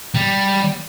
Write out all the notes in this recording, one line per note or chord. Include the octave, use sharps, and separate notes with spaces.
G3